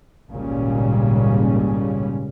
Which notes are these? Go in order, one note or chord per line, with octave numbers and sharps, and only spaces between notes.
G#1 C#2 A#2 C#3 G3 C#4